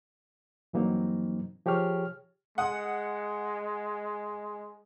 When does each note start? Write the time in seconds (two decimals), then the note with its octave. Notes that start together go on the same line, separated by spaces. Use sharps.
0.73 G2 E3 F#3 A#3 C4 D#4
1.66 F3 G4 G#4 C#5 F6
2.58 G#3 F#5 D#6